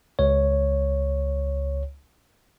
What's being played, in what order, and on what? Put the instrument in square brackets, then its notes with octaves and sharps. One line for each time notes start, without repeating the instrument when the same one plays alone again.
[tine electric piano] C#2 C#5